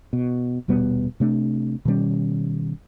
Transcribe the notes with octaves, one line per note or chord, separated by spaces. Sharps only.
B2
D#1 B2 G3 B3
C3 A3 D4
B2 D#3 G3 C#4